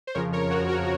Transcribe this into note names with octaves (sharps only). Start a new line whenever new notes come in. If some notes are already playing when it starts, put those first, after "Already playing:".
C5
F2 C#3 F3 A#4 C#5
A#4 C#5
F#4 A#4
F#4 A#4